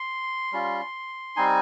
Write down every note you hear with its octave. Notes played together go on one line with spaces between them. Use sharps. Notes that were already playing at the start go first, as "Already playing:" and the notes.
Already playing: C6
G3 C#4 F4
G3 C4 D#4 G#5